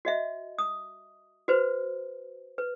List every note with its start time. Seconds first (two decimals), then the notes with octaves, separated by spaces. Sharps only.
0.05 F#4 D#5 E5
0.58 D#6
1.48 F#4 B4 C5
2.58 B4